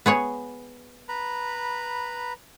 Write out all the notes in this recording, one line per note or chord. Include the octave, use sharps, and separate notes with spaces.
B3 G#4 C#5
B4 A#5 B5